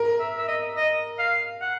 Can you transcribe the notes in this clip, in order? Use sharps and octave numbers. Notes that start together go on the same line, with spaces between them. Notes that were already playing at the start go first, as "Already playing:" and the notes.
Already playing: A#4
E5
E5
D#5
D#5
F5
F#5